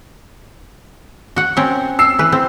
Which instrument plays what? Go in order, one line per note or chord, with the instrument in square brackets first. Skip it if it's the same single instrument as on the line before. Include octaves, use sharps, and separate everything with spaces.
[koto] F#4 F#5
C4 C#4 A#4
[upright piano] E6 C7
[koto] E3 B4
C4